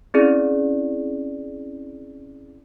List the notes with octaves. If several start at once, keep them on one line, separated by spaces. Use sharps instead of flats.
C4 C#4 E4 G#4 D5